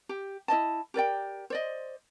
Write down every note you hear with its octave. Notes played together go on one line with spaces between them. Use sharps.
G4
E4 D5 D#5 A5
G4 A#4 D5 G5
C5 D5 D#5